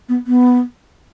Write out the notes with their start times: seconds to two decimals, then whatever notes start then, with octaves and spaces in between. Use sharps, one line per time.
0.09 B3
0.27 B3